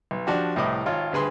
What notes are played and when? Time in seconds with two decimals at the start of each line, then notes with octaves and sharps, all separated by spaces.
0.11 B1
0.27 F3 D4 F#4 G4
0.56 C2 A2 B4 D#5 D6
0.86 G#1 F4 C#5
1.12 D2 G2 G#4 B4 C6